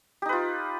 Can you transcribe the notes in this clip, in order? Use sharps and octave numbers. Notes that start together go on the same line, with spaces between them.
D#4 F4 G4 B4